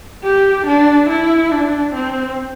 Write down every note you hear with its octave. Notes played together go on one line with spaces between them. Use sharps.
G4
D4
E4
D4
C4